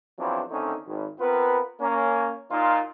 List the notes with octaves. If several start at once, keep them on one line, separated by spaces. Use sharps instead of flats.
E2 F3 F#3 C4 D4 E4
D3 D#3 A3 C4 C#4 D#4
G#1
B3 C4 F4 A#4 B4
A#3 C#4
A#2 D#4 F4